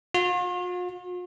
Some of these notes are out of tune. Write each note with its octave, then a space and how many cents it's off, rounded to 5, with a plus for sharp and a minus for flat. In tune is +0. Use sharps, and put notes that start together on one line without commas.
F4 +45